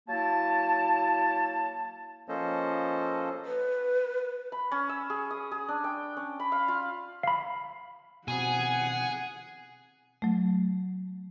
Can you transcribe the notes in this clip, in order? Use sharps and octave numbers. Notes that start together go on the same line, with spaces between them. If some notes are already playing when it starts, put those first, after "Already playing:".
F#3 A#3 E4 A5
F3 A#3 C#4 A4 C5 D#5
B4
B5
C#4
E6
G#4
D#6
G#4
D4
G5
C#4
B5
F5
F4
F5 B5
B2 C4 G#4 F#5 G#5
F#3 A3